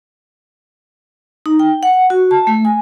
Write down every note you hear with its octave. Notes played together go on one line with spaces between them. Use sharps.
D#4
G5
F#5
F#4
A5
A3
G#5